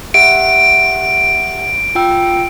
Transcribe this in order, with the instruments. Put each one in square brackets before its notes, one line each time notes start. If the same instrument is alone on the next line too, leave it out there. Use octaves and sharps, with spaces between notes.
[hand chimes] G4 E5 F#5 [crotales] D7
[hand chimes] F4 G5 E6